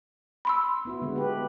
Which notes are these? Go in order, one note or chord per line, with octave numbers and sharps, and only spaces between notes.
B5 C6 E6
B3 E4 F#4
D3 G#3 B3
G4 B4